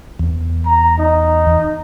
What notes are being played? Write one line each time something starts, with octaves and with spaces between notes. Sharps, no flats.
E2
A#5
D#4